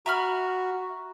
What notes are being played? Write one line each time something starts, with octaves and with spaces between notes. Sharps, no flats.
F#4 E5 A#5 B5 F6